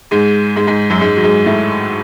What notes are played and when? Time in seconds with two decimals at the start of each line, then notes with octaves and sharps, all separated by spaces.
0.11 G#2 G#3
0.56 G#2 G#3
0.67 G#2 G#3
0.90 F#2 F#3
1.01 G#2 G#3
1.17 F#3
1.23 G#2 G#3
1.46 A2 A3